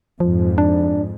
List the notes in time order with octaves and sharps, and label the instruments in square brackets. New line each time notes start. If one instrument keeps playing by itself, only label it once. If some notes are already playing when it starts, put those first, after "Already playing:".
[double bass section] F2 G#2 [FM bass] F3
[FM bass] D4